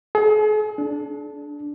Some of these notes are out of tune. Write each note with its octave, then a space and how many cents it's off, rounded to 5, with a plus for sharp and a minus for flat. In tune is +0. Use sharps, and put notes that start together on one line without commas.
G#4 +45
D4 -5